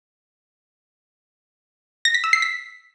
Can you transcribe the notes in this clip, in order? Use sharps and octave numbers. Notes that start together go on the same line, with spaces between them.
A#6
B6
E6
C7
B6